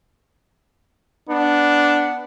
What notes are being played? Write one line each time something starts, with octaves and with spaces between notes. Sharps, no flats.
B3 D4